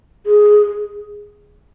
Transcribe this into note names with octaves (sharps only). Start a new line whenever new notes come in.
G#4